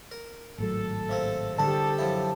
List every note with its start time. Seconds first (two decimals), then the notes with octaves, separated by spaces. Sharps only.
0.11 A#4
0.58 G#1 A2 F#3 A4
1.09 C3 A#3 C4
1.58 C2 D3 G4 A4 F#5 A5
1.98 F#2 F3 E4